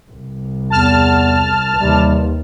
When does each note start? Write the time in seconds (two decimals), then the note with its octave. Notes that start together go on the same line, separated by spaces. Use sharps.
0.10 C2
0.70 E2 A5 F6
1.79 D#2 C3 E3 G3